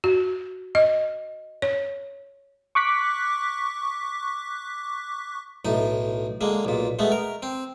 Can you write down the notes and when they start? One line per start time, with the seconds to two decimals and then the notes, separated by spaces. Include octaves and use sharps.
0.04 F#4
0.75 D#5
1.62 C#5
2.75 C#6 D6 F#6 B6
5.65 B1 A2 D#4
6.41 D3 G#3 A#3
6.65 B1 A#2
6.99 G#3 A3 B3
7.12 A#4
7.43 C4